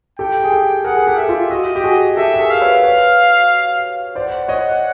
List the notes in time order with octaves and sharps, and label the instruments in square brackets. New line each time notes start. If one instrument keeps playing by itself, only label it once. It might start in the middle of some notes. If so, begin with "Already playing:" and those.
[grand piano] G4 A4 [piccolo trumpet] G5
[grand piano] G#4
G4 A4
[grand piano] G#4 A#4 [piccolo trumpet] F#5
[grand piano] G#4
G4 A4
[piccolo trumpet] E5
[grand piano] F4 G4
[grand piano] F#4 [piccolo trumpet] D#5
[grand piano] G4
F#4 G#4
[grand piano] G4 A4 [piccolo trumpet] E5
[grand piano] A4
G#4 A#4
[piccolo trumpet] F5
[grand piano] B4 C#5
B4 C#5
[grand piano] C5 D5 [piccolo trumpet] F#5
[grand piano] C#5 D#5